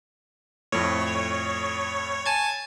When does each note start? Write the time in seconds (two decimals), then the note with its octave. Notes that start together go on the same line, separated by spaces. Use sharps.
0.72 F2 A2 C#5
2.25 G#5 A5 G#6